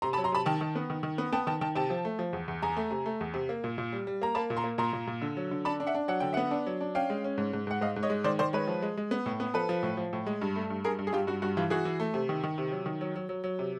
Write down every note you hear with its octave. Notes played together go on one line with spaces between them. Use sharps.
C3 A#5 C6
A5 B5
F#3
A#5 C6
C3 A5 B5
D#3 G5 A5
D#3
B3
D#3
D#3
B3
B3 G5 A5
D#3 G5 A5
D#3 G5 A5
C3 G5 A5
F3
A3
F3
E2
E2
E2 G#5 A#5
A3
C3
A3
E2
C3
A#3
A#2
A#2
G3
G3
A#3 A#5
A#3 A5 B5
A#2
A#5 C6
A#3
A#2 A#5 C6
A#2
A#2
D3
F#3
D3
D4 A5 B5
D4
E5 F#5
D4
F#3 F#5
D3 G5
B3 E5 F#5
D4
F#3
D4
C#4 F5 G5
G#3
C#4
G#2
G#2
G#2 F#5
G#2 D#5 F5
G#2
C#5 D#5
G#3
D#3 C5 D5
D#3 C5 D5
G#3 B4 C#5
F3
G#3
G#3
B3
A2
B3
F3 A4 B4
F3
A2
F3
A2
G#3
G2
A3
G2
G2 G#4 A#4
G2
G#4
G2 F4 G4
G2 F#4
G2 F#4
E3 F4 G4
E3 F#4 G#4
E3
A3
C3
D#3
D#3
C3
F#3
D#3
F#3
F#3
F#3
F#3
C3